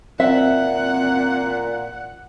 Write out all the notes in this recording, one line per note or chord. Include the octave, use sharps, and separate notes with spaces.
A#2 C4 E5 F#5